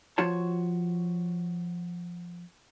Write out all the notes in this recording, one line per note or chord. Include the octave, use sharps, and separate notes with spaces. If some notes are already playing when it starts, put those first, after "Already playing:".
F3 F4 F#4 C#5 A5